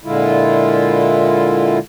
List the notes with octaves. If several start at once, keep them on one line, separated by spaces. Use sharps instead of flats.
A#2 D3 G#3 E4 F4